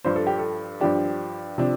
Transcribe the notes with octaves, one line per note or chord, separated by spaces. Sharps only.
G2 F3 D4 C5
A4
G4
A4
G2 F3 D4 G4
C3 F3 D4